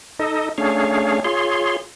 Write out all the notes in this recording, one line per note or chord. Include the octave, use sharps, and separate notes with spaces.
D#4 A4 D#5
A3 C#4 D4 G#4 C#5 F5
F4 G#4 C#5 C6